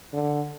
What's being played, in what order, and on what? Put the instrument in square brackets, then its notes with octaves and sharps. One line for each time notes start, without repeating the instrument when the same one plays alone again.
[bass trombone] D3